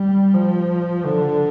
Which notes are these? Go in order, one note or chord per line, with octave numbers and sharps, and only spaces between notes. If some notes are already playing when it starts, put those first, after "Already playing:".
Already playing: G3
F3
D3